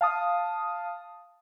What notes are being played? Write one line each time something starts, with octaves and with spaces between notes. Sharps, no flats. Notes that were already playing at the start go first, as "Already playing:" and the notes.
F5 A5 D#6